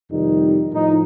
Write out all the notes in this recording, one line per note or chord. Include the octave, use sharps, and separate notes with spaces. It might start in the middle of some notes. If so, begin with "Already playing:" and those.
F2 C3 D#3 G3 D#4
A2 F3 D#4